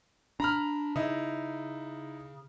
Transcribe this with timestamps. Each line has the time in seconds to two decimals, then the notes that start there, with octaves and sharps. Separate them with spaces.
0.40 D4 A#5 B5 F6
0.96 C#3 D#4 E4